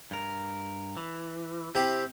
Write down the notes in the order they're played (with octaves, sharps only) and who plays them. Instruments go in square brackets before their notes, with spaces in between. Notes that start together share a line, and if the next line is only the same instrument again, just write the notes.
[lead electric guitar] G2 A#4
E3
[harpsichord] C3 E4 G4 [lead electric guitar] C4